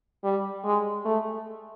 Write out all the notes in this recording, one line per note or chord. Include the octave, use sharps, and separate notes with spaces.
G3
G#3
A3